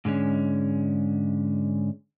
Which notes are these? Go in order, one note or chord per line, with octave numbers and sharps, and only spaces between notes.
G#2 D3 G#3 C#4